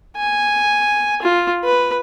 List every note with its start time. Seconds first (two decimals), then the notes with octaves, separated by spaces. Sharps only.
0.17 G#5
1.23 F4
1.64 B4